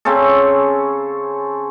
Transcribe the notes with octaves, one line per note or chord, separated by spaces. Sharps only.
C#3 C4 C#4 A4